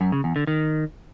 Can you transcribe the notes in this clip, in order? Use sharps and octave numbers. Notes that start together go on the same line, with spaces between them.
F#2
C#3
E2
D3
D#3